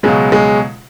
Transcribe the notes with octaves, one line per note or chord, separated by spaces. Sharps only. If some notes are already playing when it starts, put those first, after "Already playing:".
C#2 B2 F#3 G#3
G#3